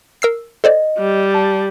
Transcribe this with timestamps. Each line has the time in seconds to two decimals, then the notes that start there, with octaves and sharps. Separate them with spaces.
0.22 A#4 E6 C7
0.64 A4 C5 D5 D#5
0.98 G3
1.34 A5